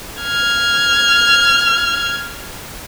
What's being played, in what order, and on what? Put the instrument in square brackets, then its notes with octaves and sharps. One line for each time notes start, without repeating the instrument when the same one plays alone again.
[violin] F6 G#6